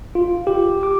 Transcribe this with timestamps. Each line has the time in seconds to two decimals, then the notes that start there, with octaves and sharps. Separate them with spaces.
0.15 F4
0.47 G4
0.83 D6